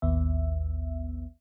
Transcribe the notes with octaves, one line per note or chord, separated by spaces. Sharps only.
A1 D#2 B3 E5